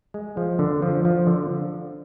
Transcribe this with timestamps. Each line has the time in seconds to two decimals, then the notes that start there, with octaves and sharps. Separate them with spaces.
0.14 G#3
0.37 F3
0.59 D3
0.82 F3
1.05 F3
1.27 D3